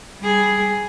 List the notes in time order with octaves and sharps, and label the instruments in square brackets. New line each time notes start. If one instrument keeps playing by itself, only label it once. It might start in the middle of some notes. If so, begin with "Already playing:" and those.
[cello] G3 G#4